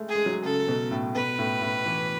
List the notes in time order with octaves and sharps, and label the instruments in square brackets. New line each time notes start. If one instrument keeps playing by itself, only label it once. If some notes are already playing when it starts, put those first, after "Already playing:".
Already playing: [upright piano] G#3 A3
[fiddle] G#4
[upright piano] G#3
F#3
[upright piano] C#3 [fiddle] A4
[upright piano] B2
A2
[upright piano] B2 [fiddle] B4
[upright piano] A2
A2
E3